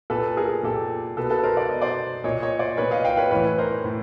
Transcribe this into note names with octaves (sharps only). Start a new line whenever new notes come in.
A#2 A4 B4
G#4 A#4
A#2 G4 A4
B2 A4 B4
A4 B4
A#4 C5
D5
B2 D#5
C5 D5
A#2 C#5 D#5
C#5 D#5
C5 D5
A#2 B4 C#5
D#5 F5
F5 G5
B4 C#5
A2 E3 B4 C#5
A#4 C5
A2